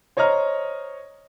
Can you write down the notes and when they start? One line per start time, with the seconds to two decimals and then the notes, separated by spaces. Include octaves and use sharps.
0.17 C5 C#5 D#5 A#5 F6